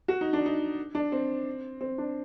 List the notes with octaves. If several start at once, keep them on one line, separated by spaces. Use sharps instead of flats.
F#4
D#4
D4
D#4
D4
C4
C4
D4